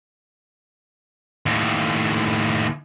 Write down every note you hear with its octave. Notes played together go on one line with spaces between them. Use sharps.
D#2 A2